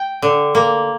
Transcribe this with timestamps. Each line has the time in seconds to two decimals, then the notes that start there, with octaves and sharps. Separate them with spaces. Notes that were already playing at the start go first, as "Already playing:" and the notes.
Already playing: G5
0.22 D3
0.55 A#3